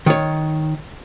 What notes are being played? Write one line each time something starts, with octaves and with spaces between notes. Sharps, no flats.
D#3 C#5